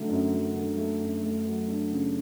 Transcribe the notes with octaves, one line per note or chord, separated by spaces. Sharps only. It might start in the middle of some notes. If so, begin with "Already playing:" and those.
Already playing: D3 F#3 A3
F#2
F#3
D3
A3
F#2
A3
F#3
D4
C#3